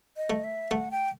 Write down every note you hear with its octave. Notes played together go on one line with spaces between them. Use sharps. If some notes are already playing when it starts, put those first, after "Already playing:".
D#5
A3
E5
A3 F#5
G5